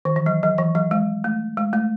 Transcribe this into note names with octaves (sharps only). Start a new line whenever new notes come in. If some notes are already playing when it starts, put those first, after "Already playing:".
D#3
E3
F#3
F#3
E3
F#3
G#3
A3
G#3
A3